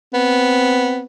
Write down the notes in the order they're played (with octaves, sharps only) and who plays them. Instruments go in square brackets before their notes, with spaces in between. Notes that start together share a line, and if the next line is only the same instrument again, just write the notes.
[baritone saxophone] B3 [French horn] C4